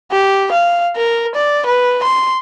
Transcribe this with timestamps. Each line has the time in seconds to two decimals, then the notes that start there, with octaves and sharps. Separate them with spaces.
0.11 G4
0.52 F5
0.96 A#4
1.35 D5
1.66 B4
2.03 C6